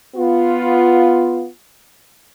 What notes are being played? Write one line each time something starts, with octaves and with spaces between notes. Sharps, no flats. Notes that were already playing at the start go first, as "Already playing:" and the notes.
B3 F4